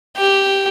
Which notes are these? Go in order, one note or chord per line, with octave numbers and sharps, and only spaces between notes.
G4